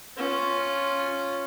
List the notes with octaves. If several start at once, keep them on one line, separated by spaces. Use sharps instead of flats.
C#4 F4